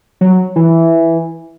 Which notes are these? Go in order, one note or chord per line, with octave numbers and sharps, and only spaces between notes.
F#3
E3